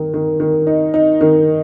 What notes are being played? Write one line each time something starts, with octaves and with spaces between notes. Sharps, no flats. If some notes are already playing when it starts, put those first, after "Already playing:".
Already playing: D#3
D#3
D#3
D#4
D#4
D#3